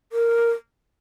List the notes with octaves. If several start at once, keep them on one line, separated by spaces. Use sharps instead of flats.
A#4